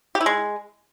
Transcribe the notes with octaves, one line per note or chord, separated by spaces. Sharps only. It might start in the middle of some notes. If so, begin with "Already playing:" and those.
G4
E4
G#3